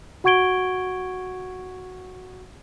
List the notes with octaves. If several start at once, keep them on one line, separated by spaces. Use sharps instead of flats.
F#4 F#5 C#6 G#6 D7 G7